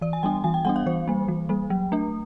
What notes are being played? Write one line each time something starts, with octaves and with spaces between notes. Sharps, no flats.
E3 D5
G#5
G3 B3 D4 G5
E3 G#5
G5
G3 B3 D4 F#5
F5
E3 C5
G3 A#3
E3
G3 A#3
F#3
A3 D4